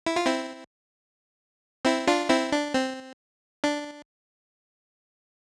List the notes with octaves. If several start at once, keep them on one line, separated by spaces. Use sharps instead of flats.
E4
F4
C4 E4
C4 E4
D4 F4
C4 E4
D4
C4
D4